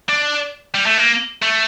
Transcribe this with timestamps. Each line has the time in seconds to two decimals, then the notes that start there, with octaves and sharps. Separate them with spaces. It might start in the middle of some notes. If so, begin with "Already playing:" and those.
0.09 D4
0.75 G3
0.86 A3
0.98 A#3
1.42 A3